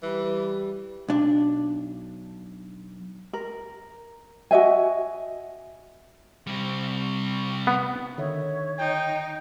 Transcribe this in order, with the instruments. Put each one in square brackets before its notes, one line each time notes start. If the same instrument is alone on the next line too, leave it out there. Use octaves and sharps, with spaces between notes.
[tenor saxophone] E3 [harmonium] G3
[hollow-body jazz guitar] B1 D4
[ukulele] A#4
F#4 D#5 E5 G#5
[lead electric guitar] C3 G3
[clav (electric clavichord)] B3
[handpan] D3 D#3 E5 [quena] C#5
[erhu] D#4 [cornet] G5